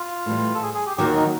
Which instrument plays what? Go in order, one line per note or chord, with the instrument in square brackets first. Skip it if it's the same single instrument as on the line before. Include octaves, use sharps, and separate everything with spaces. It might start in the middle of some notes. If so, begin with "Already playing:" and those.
Already playing: [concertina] F4
[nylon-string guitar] A2 E3 G3
[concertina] A4
G#4
G#4
G4
[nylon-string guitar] D#2 D#3 F#3 [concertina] G4
[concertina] D#4